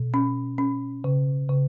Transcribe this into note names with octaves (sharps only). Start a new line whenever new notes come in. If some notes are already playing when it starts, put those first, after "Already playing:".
Already playing: B2
C#4
C#4
C#3
C#3